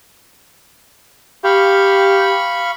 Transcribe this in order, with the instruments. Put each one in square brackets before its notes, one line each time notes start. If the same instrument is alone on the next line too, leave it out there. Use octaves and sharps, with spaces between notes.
[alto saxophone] G4 [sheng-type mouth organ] F5 B5 C#6